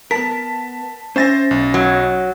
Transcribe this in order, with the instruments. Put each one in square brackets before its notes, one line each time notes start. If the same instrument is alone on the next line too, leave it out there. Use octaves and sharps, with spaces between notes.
[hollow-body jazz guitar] B3 A#4 [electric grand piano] A5 B6
[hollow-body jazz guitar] C#4 E5 G#5 [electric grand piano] C5 A6 A#6
[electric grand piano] B1
[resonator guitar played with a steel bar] F#3